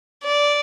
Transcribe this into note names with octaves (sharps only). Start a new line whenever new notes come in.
D5